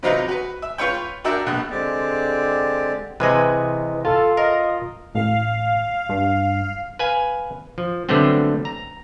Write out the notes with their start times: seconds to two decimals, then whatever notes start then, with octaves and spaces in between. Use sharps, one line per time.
0.03 C3 F#3 C4 D#4 F4 B4
0.28 F#4 B4
0.62 E5
0.78 F4 B4 C#5 G5
1.24 D4 F#4 A#4 E5 G5
1.46 A#1 B2 F#6
1.71 D3 G#3 C4 G4 D5
3.20 C3 E3 G#3 B4 D#5 G#5
4.05 F4 A4
4.37 A#4 D#5
5.15 A1 F5
6.09 G2
6.99 B4 F5 G#5
7.78 F3
8.09 D3 F#3 G3 A3 B3 C4
8.65 A#5